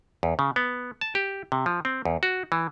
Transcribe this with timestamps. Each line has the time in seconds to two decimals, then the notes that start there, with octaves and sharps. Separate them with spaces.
0.23 E2
0.39 C#3
0.56 B3
1.01 A5
1.15 G4
1.52 C3
1.66 F3
1.85 C4
2.05 E2
2.23 F#4
2.52 E3